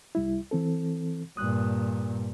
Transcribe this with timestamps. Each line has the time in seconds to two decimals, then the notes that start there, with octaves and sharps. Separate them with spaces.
0.15 C2 G3 E4
0.51 E3 C4 A4
1.37 G2 A#2 D#6 F#6